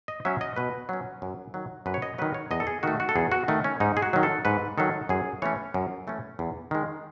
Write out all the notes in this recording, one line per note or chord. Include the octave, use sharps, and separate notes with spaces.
D#5
F#3 C#4 E5
D#5
B2 B4
F#3 C#4
F#2
D#3 F#3
F#2 B4
C#5
D#5
D#3 F#3 B4
C#5
E2 D#5
A4
G#4
D#3 A3 F#4
F#4
A4
E2 G#4
F#4
D#3 A3
C#4
G#2 D#4
G#4
F#4
D#3 F#3
A4
G#2 B4
D#3 F#3 A4
F#2 G#4
E3 A3 C#4 C#5
F#2
E3 A3 C#4
E2
D#3 G#3